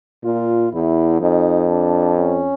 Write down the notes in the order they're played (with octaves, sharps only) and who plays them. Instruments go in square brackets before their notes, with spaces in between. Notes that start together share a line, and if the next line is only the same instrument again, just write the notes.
[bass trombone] A#2 [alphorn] F4
[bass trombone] E2 [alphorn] E4
[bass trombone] F2 [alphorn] D#4
[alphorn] D4
C#4